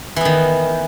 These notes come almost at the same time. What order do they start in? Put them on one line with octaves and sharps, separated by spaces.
E3 B3 D#3